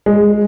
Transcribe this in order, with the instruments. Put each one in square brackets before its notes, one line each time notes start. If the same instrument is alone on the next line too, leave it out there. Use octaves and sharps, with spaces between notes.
[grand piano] G#3